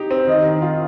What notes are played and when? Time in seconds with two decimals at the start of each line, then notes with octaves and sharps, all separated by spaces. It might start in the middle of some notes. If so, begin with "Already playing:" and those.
Already playing: D#4 G4
0.11 C4
0.27 D#3 D#5
0.45 D#3
0.62 F4